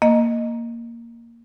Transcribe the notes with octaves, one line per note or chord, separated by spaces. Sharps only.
A#3 D#5